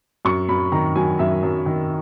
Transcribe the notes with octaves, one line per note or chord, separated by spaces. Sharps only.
F#2 C#6
F#2 B5
D#3 A#5
F#3 G#5
F#2 E5
F#2
D#3